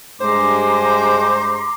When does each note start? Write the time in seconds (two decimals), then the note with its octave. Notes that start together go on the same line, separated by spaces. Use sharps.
0.21 G2 G#3 C5 A#5 C6 D6